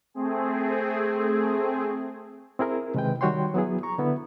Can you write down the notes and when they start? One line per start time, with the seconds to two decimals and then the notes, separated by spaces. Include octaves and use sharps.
0.14 A3 C4 G#4
2.59 C4 E4 G#4 A#4
2.95 C3 D#3 G#3 B4 G5
3.21 D#3 G3 F#4 C#5 G5 C6
3.54 F#3 B3 E4 G#4
3.83 A#5 C#6
3.98 D3 B3 E4